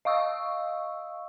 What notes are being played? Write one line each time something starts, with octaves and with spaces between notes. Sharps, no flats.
D#5 F5 C#6 D#6 E6